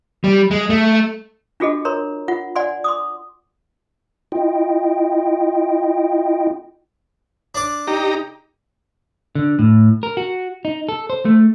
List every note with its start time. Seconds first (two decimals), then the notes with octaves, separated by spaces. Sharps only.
0.24 G3
0.51 G#3
0.70 A3
1.60 D4 F4 F#4 G#4 A4 D#5
1.85 A#4 C#5 A#5 C6
2.28 F4 F#5
2.56 D5 F#5 G#5 C6
2.84 C6 D6 D#6
4.32 E4 F4 D#5 G5
7.55 D4 D5
7.87 D#4 G4 A#5
9.35 D3
9.59 A2
10.03 A#4
10.17 F#4
10.65 D#4
10.89 A4
11.10 C5
11.25 A3